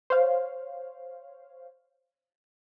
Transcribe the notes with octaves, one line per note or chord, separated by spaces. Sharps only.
C5 C#5 F5